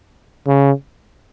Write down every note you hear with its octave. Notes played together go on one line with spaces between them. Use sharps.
C#3